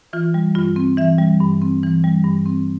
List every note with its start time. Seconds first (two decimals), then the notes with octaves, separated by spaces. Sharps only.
0.13 E3 F4
0.34 G3
0.55 G2 F4
0.76 C4
0.97 E3 E5
1.18 G3
1.41 G2
1.61 C4
1.83 E3
2.04 G3
2.24 G2
2.46 C4